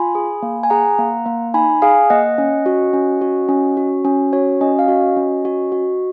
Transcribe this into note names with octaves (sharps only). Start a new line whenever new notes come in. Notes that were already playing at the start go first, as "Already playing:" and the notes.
Already playing: F4 G#5 B5
G#4
A#3
G#5
G#4 F#5 A#5
A#3
A#3
D#4 G#5 B5
G#4 F5 G#5
A#3 D#5 F#5
C#4
F#4
C#4
F#4
C#4
F#4
C#4
F#4 C#5
C#4 D#5
F5
F#4 D#5
C#4
F#4
F#4